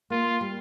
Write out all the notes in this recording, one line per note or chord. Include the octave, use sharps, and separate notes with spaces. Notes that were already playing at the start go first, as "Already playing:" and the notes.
A#3 F4
G3